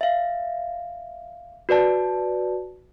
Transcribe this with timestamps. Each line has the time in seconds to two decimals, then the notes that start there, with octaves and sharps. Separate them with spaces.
0.01 E5 F5
1.69 F#4 B4 D5 A5